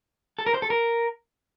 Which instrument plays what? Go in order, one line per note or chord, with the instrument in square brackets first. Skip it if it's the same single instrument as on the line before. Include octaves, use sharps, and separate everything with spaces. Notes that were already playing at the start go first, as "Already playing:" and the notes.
[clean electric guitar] A4
A#4
C5
A4
A#4